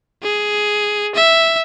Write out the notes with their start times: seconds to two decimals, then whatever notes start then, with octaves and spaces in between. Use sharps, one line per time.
0.23 G#4
1.15 E5